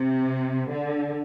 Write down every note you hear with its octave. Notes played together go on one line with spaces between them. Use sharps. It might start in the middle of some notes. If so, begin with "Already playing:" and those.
Already playing: C3
D3